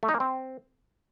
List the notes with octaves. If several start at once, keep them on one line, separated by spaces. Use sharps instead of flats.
A3
D#4
A#3
C4